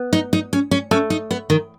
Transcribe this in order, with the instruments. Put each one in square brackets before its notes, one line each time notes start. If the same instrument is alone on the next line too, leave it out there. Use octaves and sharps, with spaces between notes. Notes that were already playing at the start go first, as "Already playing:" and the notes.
Already playing: [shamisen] B3
[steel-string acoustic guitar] D#4
D#4
C#4
C#4
[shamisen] A3 [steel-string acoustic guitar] C#4
[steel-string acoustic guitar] D#4
B3
D#3